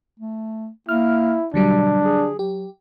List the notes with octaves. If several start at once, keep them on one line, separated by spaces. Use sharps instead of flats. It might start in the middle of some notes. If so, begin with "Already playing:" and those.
A3
A#3 E4 F6
B2 D3 F#3 G3 D4
G#4
F#3 G4